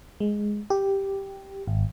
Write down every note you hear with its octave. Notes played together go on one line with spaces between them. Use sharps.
G#3
G4
G#1